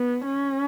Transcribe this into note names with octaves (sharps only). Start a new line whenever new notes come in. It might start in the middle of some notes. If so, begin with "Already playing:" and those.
Already playing: B3
C#4